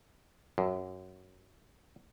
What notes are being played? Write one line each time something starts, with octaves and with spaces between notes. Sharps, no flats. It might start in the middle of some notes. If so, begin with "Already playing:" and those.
F#2